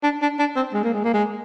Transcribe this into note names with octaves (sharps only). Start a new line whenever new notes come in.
D4
D4
D4
C4
G#3
A#3
G#3
A#3
G#3